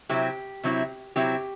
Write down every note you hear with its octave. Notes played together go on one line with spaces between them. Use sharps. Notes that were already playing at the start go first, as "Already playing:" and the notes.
C3 F#3 C4 E4 G4
C3 F#3 C4 E4
C3 F#3 C4 E4 G4